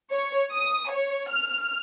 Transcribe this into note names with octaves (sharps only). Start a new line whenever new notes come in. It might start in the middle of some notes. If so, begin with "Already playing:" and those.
C#5
D#6
C#5
F6